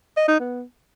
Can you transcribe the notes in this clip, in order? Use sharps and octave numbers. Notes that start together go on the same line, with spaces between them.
D#5
D#4
B3